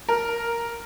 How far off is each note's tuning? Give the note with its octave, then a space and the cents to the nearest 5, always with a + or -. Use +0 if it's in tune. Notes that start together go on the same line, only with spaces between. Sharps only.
A#4 +0